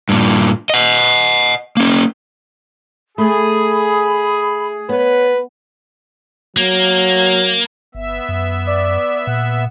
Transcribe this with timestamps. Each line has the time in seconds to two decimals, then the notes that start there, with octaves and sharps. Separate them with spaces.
0.09 G2 A#2
0.70 D#5 F#5
1.77 A#3 C#4
3.18 A3 G#4 B5
4.89 B3 B4 C#5
6.57 F#3 A#3
7.95 G1 B3 E5
8.29 F#2
8.67 D5
9.27 A#2 F#5